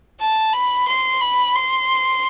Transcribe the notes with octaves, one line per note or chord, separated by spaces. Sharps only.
A5
B5
C6
B5
C6